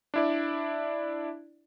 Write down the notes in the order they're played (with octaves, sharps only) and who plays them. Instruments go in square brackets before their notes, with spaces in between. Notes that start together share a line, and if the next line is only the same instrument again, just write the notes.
[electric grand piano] D4 E4 D5